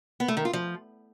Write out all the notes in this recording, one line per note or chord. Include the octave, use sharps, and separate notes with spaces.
B3
A3
D#3
F4
F3